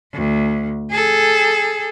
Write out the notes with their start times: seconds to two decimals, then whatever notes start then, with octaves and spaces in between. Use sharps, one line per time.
0.14 D2
0.91 G#4 A4